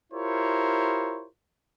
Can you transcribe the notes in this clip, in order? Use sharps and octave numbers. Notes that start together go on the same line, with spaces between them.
E4 F4 G4 A#4 C5 C#5